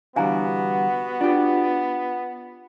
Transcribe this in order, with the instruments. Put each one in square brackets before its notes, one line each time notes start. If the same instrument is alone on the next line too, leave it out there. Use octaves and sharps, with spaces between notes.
[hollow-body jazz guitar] D3 E3 G3 [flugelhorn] B3 [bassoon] F#4 [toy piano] F5 G#5 A#5
[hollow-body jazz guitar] D4 G4 [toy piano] F4